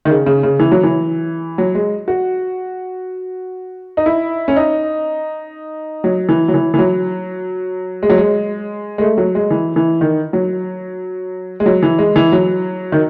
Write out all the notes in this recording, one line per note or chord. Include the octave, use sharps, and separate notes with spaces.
D#3
C#3
C#3
C#3
E3
F#3
E3
F#3
G#3
F#4
D#4
E4
C#4
D#4
F#3
E3
F#3
E3
E3
F#3
G#3
F#3
G#3
G#3
A3
F#3
G#3
E3
E3
D#3
F#3
G#3
F#3
E3
G#3
E3
F#3
D#3